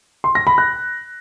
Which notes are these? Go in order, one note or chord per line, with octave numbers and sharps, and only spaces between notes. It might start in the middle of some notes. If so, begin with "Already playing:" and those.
C6
A#6
B5
F#6